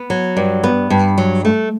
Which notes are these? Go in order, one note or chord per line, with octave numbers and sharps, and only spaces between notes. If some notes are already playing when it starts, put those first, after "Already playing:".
Already playing: B3
F#3
G2
B3
G2
F#3
A3